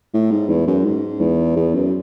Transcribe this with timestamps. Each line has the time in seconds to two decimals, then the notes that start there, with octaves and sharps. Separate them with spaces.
0.14 A2
0.31 G#2
0.49 E2
0.67 F#2
0.85 G#2
1.20 E2
1.56 E2
1.75 F#2